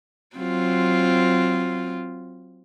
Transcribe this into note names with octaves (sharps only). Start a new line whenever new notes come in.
F#3 C4 F4